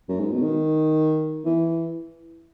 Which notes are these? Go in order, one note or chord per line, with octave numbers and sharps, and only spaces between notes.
F#2
G#2
B2
D#3
E3